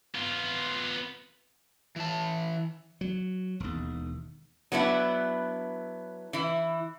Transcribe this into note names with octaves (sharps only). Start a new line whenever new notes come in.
B3 F4
E3 A5
F#3
E1 D#2
F#3 B3 D4 E4
E3 E4